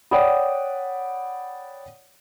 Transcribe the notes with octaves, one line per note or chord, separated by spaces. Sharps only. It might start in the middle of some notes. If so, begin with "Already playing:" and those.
C#5 D5 F#5 G5 B5 D#6